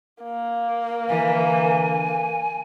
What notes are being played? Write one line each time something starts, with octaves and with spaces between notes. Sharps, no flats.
A#3
D3 E3 A#4 G#5